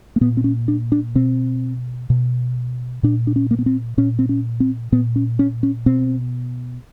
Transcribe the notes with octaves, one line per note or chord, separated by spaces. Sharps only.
A#3
A#2 B3
C4
C#4
D4
D4
B2 C4
B2
A#2 D4
D4
C#4
A#3
B3
C4
A#2 C#4
C4
C#4
C4
A#2 B3
C#4
C#4
C#4
B2 C4